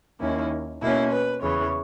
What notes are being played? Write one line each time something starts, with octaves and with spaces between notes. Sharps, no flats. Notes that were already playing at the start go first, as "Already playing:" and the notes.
D#2 D#3 A#3 C#4 E4
B2 A#3 C#4 E4
B4
E2 C#3 E3 C#5